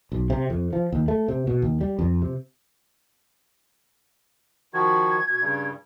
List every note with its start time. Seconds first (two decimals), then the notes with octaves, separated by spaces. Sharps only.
0.12 B1
0.30 C3
0.50 F2
0.73 F3
0.92 D#2
1.08 A3
1.28 C3
1.47 B2
1.62 D#2
1.81 G3
1.99 F2
2.22 C3
4.74 D#3 F3 F#4 G#6
5.28 B2
5.41 G2 C#3 G3